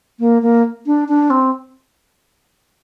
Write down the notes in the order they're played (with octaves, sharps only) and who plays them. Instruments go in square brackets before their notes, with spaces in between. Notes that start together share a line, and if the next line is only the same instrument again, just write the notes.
[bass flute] A#3
A#3
D4
D4
C4